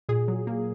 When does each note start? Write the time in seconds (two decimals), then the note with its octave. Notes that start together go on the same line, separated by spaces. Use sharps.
0.09 A#2 G#4
0.28 F#3
0.47 A#3